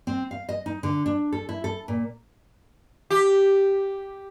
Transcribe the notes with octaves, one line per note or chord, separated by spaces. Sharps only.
C4
F5
D#5
D#4
D3
D4
A4
E4
A4
A#2
G4